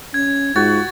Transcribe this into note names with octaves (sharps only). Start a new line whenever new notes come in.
C#4 G#6
G#2 F4 F#4 A6